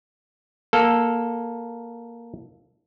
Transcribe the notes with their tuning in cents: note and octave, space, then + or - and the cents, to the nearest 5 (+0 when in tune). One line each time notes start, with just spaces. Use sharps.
A#3 +5 A4 +0